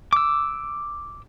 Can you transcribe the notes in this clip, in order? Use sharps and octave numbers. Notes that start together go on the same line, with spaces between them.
D6 E6